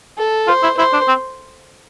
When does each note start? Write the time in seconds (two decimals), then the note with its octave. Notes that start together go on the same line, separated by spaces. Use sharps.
0.18 A4
0.47 F4 C5
0.63 E4
0.77 E4 C5
0.93 D4
1.08 C4